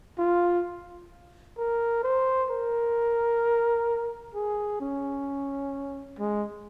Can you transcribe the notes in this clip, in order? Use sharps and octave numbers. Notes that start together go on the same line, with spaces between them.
F4
A#4
C5
A#4
G#4
C#4
G#3